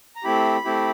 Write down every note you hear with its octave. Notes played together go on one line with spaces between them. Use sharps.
A#5
A3 C4 E4 G4 B5
A3 C4 E4 G4